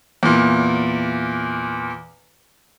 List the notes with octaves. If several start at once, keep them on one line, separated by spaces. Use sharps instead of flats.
E2 A#2